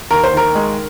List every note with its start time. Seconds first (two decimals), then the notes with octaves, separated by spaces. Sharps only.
0.11 D#2 A#4
0.24 C5
0.33 D#3 A#4
0.55 G#3